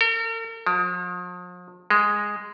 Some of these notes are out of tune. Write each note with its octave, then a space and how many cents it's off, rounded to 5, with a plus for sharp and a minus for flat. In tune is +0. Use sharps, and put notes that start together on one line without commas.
A#4 -45
F3 +40
G#3 -5